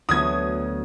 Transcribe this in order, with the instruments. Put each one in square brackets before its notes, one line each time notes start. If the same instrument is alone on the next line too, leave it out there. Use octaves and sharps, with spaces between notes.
[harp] D2 F#3 B3 [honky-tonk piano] D#6 G#6